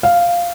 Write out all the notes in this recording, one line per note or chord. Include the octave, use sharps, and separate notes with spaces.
F5